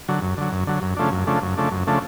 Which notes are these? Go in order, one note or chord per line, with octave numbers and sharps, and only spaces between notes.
D3 F#3
F#2
D3 F#3
F#2
D3 F#3
F#2
C#3 F3 A3 D4
F#2
C#3 F3 A3 D4
F#2
C#3 F3 A3 D4
F#2
C#3 F3 A3 D4